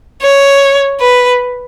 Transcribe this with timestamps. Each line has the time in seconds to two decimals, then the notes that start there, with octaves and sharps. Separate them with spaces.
0.22 C#5
1.00 B4